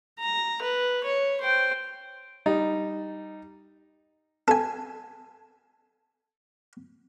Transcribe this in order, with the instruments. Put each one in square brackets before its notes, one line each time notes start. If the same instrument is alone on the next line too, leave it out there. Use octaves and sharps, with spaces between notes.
[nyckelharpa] A#5
B4
C#5
C5 G5
[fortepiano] G3 D#4
[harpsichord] A4 G#5